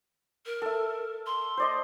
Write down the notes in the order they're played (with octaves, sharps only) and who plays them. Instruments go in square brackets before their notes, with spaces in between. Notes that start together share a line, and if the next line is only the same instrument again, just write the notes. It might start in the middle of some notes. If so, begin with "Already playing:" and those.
[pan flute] A#4
[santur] A4 E5
[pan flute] C6
[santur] C5 D5 D#5